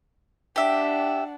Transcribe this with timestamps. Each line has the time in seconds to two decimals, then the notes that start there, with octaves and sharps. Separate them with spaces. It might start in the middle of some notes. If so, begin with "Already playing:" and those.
0.56 D4 G4 E5 F#5